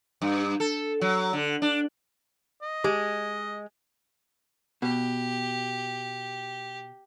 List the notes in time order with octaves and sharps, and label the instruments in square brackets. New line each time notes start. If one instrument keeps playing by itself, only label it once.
[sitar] G2
A4
F#3
D3
D4
[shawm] D#5
[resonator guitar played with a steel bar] G#3 [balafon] G4
[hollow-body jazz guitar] B2 [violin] G4